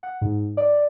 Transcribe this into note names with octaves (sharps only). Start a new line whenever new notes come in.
F#5
G#2
D5